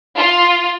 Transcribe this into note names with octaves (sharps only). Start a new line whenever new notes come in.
F4